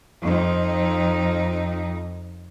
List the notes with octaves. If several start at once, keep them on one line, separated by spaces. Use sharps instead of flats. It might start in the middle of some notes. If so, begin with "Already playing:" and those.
F2 D#4